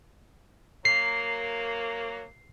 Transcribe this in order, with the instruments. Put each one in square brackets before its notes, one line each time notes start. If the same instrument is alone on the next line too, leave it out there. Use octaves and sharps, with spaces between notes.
[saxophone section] F#3 A#3 [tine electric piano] C7